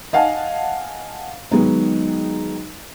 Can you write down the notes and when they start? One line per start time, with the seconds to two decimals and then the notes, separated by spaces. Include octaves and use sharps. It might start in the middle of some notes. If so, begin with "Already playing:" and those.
0.13 D#5 F5 F#5 G#5 A5
1.51 D#3 F#3 G#3 B3 D#4